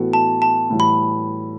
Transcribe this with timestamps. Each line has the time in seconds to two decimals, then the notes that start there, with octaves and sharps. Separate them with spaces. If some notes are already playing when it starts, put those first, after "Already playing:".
Already playing: A2 E3 B3 F#4 A4
0.13 A5
0.42 A5
0.70 A2 E3 G3
0.80 B5